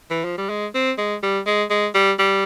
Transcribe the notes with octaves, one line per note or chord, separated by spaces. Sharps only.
E3
F3
G3
G#3
C4
G#3
G3
G#3
G#3
G3
G3